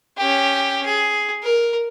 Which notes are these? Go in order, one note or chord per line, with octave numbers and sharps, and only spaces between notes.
C#4 G4
G#4
A#4